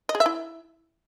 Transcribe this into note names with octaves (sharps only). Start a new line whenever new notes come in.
D#5
G#4
E5
E4